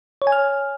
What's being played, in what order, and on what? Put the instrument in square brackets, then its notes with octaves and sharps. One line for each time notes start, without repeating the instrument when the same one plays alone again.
[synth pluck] C#5
G#5
F6